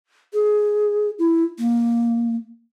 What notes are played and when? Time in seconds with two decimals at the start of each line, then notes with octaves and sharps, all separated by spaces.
0.34 G#4
1.19 E4
1.59 A#3